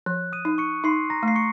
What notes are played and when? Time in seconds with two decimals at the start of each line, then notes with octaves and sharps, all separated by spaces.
0.06 F3 F#6
0.33 D#6 D#7
0.45 D#4
0.58 C#6 C#7
0.84 D#4 C6 C7
1.10 A#5 A#6
1.23 A3
1.28 C7
1.35 C#6 C#7